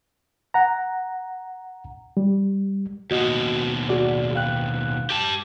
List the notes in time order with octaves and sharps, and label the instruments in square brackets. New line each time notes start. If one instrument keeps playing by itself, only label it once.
[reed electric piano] F#5 A#5
G3
[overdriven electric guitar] D#2 B2 [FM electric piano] F#4 D#5
[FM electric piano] F#4 G#4 D5
F5 G5 F#6
[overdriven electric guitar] G4 A5